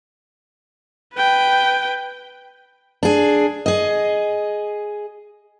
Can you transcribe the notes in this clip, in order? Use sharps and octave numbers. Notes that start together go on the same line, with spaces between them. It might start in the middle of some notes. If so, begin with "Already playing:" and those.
B4 G5
D4 G#4
G#4 D#5